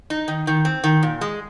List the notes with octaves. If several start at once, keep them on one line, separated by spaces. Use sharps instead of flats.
D#4
D#3
D#3
C4
D#3
A#2
G#3